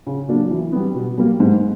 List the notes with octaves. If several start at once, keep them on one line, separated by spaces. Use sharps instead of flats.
C#3
F#3 A#3 D4
E3
G3 B3
B2
G3 A#3
G#2